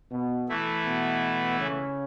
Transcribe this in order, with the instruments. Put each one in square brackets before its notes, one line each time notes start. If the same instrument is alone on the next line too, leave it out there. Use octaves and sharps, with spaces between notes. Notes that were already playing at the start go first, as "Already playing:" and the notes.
[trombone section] B2 B3
[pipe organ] E3 A3 E4
[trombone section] B2 B3
C#3 C#4